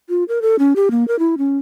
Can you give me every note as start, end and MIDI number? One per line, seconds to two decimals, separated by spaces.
0.09 0.24 65
0.28 0.42 70
0.42 0.56 69
0.59 0.73 61
0.76 0.89 67
0.91 1.06 58
1.08 1.18 70
1.19 1.35 64
1.38 1.58 61